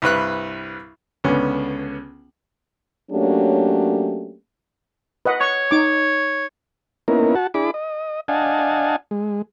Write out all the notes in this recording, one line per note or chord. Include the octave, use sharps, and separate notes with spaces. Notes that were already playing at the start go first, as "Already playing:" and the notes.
C2 G2 B4 F#6
C#2 D3 B3 C#4
F#3 A3 A#3 C#4 D4 G4
B4 D#5 F#5
C#5 C#6
D#4 D6
A#3 B3 C#4 D#4 E4 A#4
F#4 F#5 A5
D4 E4 G#4 B5 D6
D#5
D4 D#5 F5 F#5 G#5 A5
G#3